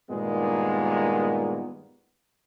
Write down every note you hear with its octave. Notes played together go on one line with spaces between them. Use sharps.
G2 A#2 D#3 G#3 B3